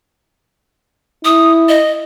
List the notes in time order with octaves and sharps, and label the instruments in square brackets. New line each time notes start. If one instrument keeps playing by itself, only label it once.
[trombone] E4 [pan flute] D#6
[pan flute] D#5